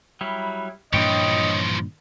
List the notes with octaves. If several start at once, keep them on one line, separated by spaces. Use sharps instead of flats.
F#3 G3 E4
G2 A#2 E3 F3 D4 C#5 D#5 G5